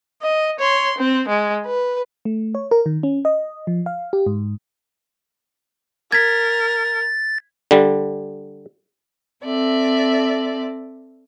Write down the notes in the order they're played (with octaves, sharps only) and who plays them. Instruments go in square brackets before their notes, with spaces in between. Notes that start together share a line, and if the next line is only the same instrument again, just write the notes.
[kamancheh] D#5
C#5 C6
C4
G#3
B4
[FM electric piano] A3
C#5
A#4
D#3
C#4
D#5
F3
F5
G4
G#2
[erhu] A#4 [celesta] G#6 B6 [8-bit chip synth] A6
[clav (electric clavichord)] D3 G3
[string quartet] C4 A4 D5 E5